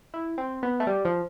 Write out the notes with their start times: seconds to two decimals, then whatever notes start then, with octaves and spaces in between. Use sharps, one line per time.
0.14 E4
0.38 C4
0.63 B3
0.80 A3
0.87 G3
1.05 F3